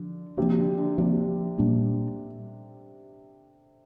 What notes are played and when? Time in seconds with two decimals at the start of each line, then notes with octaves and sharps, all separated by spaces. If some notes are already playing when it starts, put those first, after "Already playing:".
Already playing: D3 F3
0.37 C3 F3 A#3 D4
0.58 D3
0.78 D3
0.98 C3 F3 A#3 D4
1.58 A#2 G3 A#3 D4